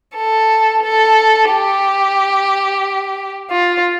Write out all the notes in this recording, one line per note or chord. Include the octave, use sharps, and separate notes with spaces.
A4
A4
G4
F4